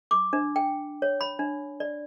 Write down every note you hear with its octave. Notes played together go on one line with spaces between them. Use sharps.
D6
D4
G5
C#5
B5
D4
D5